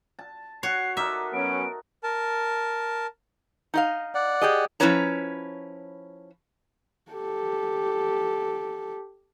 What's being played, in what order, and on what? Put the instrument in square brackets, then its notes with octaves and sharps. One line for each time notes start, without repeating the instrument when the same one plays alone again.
[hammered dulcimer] A5
[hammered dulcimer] F#4 F#5 [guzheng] C#5 [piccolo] C7
[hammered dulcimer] D#4 A4 A#4 [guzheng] E5 [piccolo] D6
[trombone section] F#3 B3 C#4 [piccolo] D7
[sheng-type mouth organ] A#4 A5
[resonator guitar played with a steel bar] D#4 D#5 F5
[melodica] D5 F#5
[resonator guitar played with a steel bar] G4 G#4 D#5
F3 C#4 E4 B4 C#5 A#5
[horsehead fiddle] G4 A4